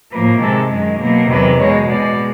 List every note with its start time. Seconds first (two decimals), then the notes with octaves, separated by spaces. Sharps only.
0.12 A2 F3 A#3 B4
0.42 C3 D#3 G#3 A4
0.71 F#2 D#3 G#3
1.01 B2 F#3 A#3
1.30 E2 C3 D#3 F#3 B4
1.59 B2 G#3 C#5
1.89 B2 G#3 D5